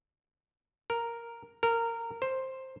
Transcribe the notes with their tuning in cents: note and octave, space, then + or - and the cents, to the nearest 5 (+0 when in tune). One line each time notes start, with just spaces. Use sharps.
A#4 +0
A#4 -15
C5 +5